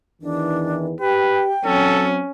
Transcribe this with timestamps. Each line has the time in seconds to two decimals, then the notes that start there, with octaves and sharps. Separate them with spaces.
0.22 E2 D#3 E3 D4
1.00 G4 B4 G5
1.65 F#3 C4 C#4 A4